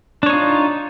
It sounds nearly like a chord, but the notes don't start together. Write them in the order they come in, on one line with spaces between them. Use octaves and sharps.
D4 C#5 D#4 F4